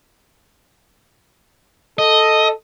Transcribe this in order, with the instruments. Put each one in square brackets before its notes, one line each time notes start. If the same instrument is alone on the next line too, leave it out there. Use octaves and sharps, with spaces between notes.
[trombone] A4 [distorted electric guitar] D#5